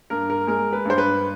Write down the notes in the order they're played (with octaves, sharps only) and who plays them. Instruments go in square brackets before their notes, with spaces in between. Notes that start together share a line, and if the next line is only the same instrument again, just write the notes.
[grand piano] G2 A#4
A#4
G#3 A#4
B4
G2 C5
B4